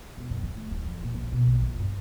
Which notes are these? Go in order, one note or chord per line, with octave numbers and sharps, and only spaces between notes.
E1
F#2
G#3
A3
D1
F3
A#2
A#1
B2
A#1
F2
G2